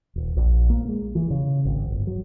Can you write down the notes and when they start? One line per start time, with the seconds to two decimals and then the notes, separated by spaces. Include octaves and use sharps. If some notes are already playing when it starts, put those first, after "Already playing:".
0.16 D#1
0.37 A#1
0.70 A#3
0.88 G#3
1.15 E3
1.30 C#3
1.65 G#1
1.91 G1
2.07 F#3